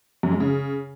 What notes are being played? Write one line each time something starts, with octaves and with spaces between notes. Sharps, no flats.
F#2
G#3
C#3